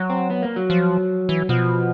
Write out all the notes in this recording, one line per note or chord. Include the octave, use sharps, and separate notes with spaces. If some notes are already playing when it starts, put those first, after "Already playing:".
Already playing: F#3
C4
B3
A#3
F#3
F3
E3
B2 F3